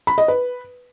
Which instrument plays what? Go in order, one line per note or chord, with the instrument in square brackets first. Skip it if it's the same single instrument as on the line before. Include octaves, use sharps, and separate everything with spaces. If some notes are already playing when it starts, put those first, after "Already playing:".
[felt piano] B5
D#5
B4